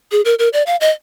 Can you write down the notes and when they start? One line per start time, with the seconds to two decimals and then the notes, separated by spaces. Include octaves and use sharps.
0.12 G#4
0.25 A#4
0.39 A#4
0.53 D5
0.67 F5
0.81 D#5